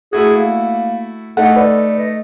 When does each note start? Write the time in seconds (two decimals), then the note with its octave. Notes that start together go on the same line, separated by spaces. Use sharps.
0.13 A3 E4 F#4 G#4
0.37 A#3
1.37 A3 D#4 A4 F#5
1.56 B4 D5
1.99 D#5